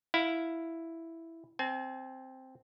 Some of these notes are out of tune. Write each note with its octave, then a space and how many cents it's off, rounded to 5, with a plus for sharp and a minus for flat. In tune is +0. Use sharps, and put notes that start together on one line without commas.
E4 +0 F5 +5
C4 +0 G#5 +45